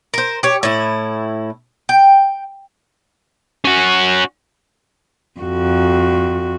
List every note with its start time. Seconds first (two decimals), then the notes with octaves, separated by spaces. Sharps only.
0.14 A#4 C5
0.43 G4 C#5
0.63 A2 E4
1.89 G5
3.65 C#4 F#4
5.40 F2 F#4